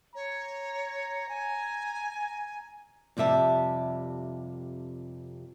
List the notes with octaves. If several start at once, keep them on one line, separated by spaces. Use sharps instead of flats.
C#5 A#5
G#5
F2 C3 G3 E5 A5